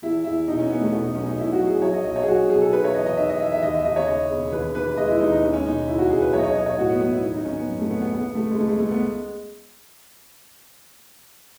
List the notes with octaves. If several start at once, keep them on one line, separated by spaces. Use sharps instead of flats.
E2 E4
E2 E4
B2 D#4
C#4
E2 B3
A3
B2 B3
D#4
B1 C#4
D#4
B2 E4
F#4
F#3
G#4
F#3 C#5
D#5
B1 D#5
C#5
G#4
B1 F#4
B1 G#4
A4
D#3 B4
C#5
E2 D#5
D#5
D#3 E5
D#5
E2 E5
E5
D#2 D#5
E5
D#2 D#5
C#5
C#3 D#5
E1
D#2 B4
D#2 B4
B4
G#3 D#5
E4
D#2 D#4
D#4
G#3 C#4
C#4
B2 D#4
C#2 E4
F#4
C#2 G#4
B4
B1 C#5
D#5
C#5
B1 D#5
C#5
A2 F#4
B3
F#3 B3
E4
D#3
D#4
G#1 C#4
B3
F#2
A3
G#1 B3
B3
C#2 B3
C#3 A3
G#3
C#2 A3
G#3
G#3 A3
B3